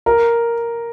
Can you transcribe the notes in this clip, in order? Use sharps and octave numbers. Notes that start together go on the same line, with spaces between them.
A#4